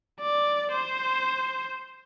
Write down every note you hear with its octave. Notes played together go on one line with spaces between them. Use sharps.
D5
C5